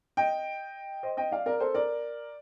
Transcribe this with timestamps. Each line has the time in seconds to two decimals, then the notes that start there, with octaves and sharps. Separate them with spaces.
0.17 D#5 G5
1.03 C5 D#5
1.17 D#5 G5
1.31 D5 F5
1.46 A#4 D5
1.60 A4 C5
1.74 A#4 D5